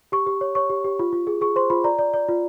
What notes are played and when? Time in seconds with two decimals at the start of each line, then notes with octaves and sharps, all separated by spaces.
0.12 G4 C#6
0.27 G4
0.41 C#5
0.55 C#5 C#6
0.70 G4
0.84 G4
0.99 F4
1.13 F4
1.27 G#4
1.41 G#4 C#6
1.56 C5 C6
1.70 F4 B5
1.84 D5 A#5
1.99 D5
2.14 D5
2.28 F4